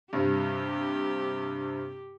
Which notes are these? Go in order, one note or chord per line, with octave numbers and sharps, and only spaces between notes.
G2 C3 G4